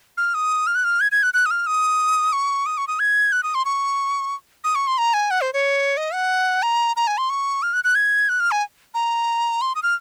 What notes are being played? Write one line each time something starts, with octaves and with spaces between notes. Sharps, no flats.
F6
D#6
F6
F#6
F6
G#6
G#6
F#6
F#6
D#6
F6
D#6
C#6
D#6
C#6
D#6
G#6
F#6
D#6
C6
C#6
D#6
C#6
C6
A#5
G#5
F#5
C5
C#5
D#5
F#5
A#5
A#5
G#5
C6
C#6
F6
F#6
F#6
G#6
F#6
F6
G#5
A#5
C6
D#6
F6